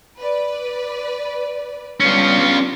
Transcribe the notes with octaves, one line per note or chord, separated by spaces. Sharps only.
B4 D5
G3 B3 C#4 D4 F4